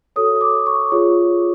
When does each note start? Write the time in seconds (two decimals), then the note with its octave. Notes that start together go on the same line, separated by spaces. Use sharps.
0.16 F#4 A4 C#5 D#6
0.36 D#6
0.41 D6
0.67 C#6
0.92 F4 G#4 C#5